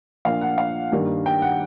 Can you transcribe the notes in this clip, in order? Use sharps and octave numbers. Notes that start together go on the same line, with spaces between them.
A#2 F3 A#3 D4 F5
F#5
F5
G2 D#3 G3 A#3 D4
G5
F#5